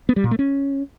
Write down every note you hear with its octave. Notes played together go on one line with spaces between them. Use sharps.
B3
G3
A#2
A3
C#4